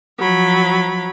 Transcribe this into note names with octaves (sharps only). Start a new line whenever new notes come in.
F3 F#3 B5